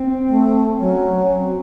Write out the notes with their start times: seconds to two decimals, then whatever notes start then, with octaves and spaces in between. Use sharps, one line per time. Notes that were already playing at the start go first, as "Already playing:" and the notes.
Already playing: C4
0.29 A3
0.79 F#3 C#4
1.30 C4